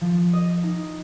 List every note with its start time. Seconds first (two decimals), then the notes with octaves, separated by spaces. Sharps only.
0.01 F3
0.33 D#5
0.64 D#4